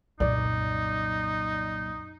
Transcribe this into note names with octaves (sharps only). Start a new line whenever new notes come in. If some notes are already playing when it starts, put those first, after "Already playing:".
C2 F#2 A#2 D#4 D5